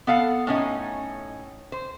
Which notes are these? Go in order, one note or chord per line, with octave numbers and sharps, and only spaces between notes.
B3 A4 F5 F#5
A2 C#4 D#4
C5